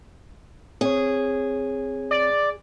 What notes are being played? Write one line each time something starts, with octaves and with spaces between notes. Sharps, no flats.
C4 G#4 C#5
D5